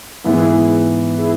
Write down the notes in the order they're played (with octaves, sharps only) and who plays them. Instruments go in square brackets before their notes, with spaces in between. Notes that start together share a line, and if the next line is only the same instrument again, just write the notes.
[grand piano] G#2 E3 B3 [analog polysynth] E4 G#4
[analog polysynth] E4 G#4